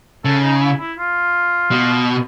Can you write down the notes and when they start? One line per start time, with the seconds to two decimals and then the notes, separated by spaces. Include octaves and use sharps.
0.25 C#3 A4
0.43 D#4
0.62 E4
0.80 E4
0.98 F4
1.71 B2